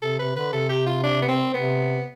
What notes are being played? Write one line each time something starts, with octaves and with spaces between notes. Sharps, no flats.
C3 A4
C3 B4
D3 B4
C3 A4
G4
F4
D4
B3
C4
C3 B3